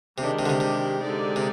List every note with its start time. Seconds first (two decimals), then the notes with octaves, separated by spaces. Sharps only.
0.18 C3 D#3 G#3 D4 G4
0.39 C3
0.46 D3
0.49 C3
0.60 C3
1.02 D3 G#3 D#4 G4 D5
1.36 C3